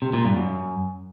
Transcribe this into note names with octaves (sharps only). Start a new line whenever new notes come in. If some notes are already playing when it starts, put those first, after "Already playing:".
C3
A#2
G2
F#2